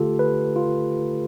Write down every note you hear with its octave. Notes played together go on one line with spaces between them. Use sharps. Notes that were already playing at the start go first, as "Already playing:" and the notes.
Already playing: D3 A3 F4 G4 A4
B4
F4